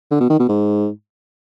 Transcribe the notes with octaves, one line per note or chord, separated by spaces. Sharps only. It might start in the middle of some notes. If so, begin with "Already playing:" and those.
D3
B2
D#3
B2
G#2